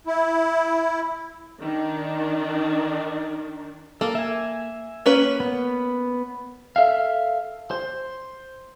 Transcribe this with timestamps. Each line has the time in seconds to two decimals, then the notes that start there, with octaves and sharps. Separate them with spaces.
0.07 E4
1.62 D#3 D4
4.01 A#3 A4
4.15 E5 G#5
5.06 A#3 C#4 B4
5.40 B3
6.76 A4 E5 F5
7.71 C5